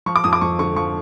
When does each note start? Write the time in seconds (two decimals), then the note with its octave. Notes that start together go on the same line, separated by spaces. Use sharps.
0.06 F3 C#6
0.16 D6
0.24 F2 D#6
0.33 D6
0.41 F2 C#6
0.59 D3 C#6
0.76 F3 C#6